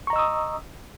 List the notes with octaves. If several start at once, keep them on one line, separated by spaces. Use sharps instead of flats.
D#5 A#5 C#6 D#6 E6